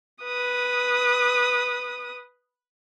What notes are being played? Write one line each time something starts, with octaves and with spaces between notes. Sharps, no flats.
B4 D#6